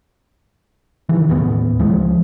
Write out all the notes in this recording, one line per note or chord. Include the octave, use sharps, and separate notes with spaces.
C3 D#3 E3
D#2 A2 B3
C#2 E3 F3 G#3